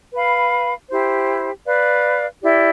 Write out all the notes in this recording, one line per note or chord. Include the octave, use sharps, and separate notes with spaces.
B4 F5 B5
E4 G4 C5
B4 D5 F5
E4 G4 D5